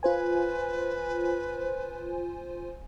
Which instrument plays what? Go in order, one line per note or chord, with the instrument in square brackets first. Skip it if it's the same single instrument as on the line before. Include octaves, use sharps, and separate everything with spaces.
[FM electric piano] F4 C5 G#5 [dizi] B4